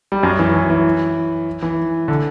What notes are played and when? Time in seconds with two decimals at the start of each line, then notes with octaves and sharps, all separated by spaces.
0.12 G3
0.23 F#2 F#3
0.39 E3
0.54 E3
0.70 E3
1.62 E3
2.08 D3